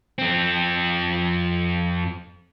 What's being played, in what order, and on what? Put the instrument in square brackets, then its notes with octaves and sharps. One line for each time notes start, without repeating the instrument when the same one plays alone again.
[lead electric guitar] F2 C4